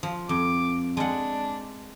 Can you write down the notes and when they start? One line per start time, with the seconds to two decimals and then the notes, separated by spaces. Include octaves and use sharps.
0.03 F3
0.29 F2 D6
0.97 G#3 D4 F#5